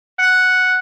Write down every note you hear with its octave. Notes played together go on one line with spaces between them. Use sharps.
F#5